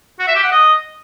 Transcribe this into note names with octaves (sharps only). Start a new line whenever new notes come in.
F#4
E5
G4
F#5
D#5